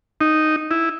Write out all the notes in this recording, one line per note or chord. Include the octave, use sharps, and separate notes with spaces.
D#4
E4